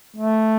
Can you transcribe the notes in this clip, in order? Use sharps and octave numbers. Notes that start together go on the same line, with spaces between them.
A3